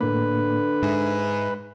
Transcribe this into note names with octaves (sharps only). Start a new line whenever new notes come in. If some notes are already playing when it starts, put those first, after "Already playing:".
A2 D3 A#3 B4
G#2 E5